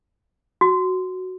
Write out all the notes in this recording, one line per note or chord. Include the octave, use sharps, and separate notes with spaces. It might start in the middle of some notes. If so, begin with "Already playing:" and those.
F#4